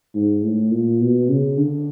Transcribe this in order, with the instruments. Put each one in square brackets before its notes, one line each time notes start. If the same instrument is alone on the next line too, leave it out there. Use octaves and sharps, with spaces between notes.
[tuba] G#2
A2
A#2
B2
C#3
D3